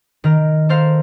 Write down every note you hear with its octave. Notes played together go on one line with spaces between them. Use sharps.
D#3 A#4
A4 A#4 C5 F5